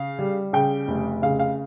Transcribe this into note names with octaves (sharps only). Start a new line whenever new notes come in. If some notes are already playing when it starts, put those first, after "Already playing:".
Already playing: C#3 F5
G3
C#3 G5
F1
C#3 F5
F5